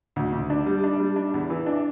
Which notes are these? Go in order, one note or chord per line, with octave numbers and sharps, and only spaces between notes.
D2
D2
D4
G3
D4
G3
D4
E2
E3
D4